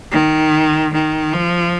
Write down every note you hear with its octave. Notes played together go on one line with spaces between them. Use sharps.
D#3
D#3
F3